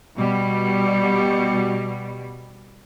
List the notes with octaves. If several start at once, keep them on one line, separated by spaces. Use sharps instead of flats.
B2 G3